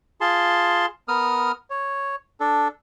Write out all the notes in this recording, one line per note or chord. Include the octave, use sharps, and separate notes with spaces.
F4 G#4 A5 C6
B3 A#4 D#6 F6
C#5
D4 A4